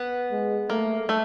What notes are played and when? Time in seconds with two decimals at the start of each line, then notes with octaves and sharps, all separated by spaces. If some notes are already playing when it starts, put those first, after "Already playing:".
Already playing: B3
0.31 G#3
0.70 A3 A#3
1.09 A3